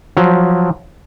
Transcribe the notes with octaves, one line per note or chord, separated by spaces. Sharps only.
F3 F#3